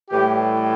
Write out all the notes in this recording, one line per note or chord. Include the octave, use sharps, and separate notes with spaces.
A2 E3 G3 G4